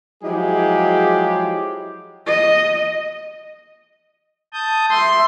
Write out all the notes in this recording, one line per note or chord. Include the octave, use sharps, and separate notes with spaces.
F3 F#3 G#3 E4 G4 G#4
D#5
A5 D#6 G6
E5 C6